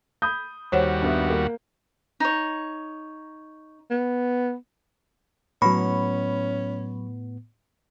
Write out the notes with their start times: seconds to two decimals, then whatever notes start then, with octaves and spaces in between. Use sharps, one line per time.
0.22 B5 D#6 G6
0.72 D#2 G3 F#4 C5 C#5 F#5
1.02 G2 B3 E5
1.30 A#3
2.20 D#4 C#5
3.91 B3
5.62 A2 F#3 B3 C#4 B5 C#6